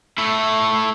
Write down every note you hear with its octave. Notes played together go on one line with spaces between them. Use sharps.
A3 E4